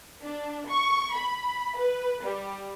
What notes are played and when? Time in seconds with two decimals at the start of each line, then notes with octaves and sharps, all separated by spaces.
0.23 D4
0.68 C#6
1.15 B5
1.76 B4
2.24 G3